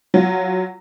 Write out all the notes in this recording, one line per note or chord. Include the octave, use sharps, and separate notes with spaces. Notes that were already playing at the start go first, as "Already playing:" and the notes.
F#3 F4